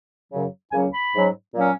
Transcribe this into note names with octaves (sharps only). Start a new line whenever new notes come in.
F#2 C#3 F#3
C#2 C#3 F#3 A#3 C#4 G#5
B5
G#2 F#3 C#4
A#2 F#3 A#3 C#4